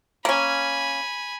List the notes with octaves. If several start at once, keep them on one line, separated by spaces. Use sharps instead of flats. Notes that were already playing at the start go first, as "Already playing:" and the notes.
A#3 C#4 G#5 B5